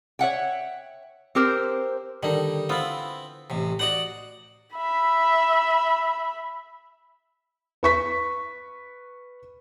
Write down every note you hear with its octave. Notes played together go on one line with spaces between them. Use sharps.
C#5 E5 F#5 G5
C4 G4 A#4 C5
D3 D#3 G3 D#4
B3 C4 E4 F4
A1 C3
F#4 C5 D5 D#5 F#5
E5 B5
B4 C#6 B6